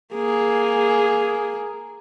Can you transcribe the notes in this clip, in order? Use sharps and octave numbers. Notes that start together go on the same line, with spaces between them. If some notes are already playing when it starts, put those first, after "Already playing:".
A#3 G#4